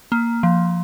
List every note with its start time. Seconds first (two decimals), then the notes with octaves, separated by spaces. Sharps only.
0.12 A#3
0.43 F3